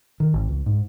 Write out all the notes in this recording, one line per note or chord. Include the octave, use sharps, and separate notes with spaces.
D#3
G#1
C#2
G#2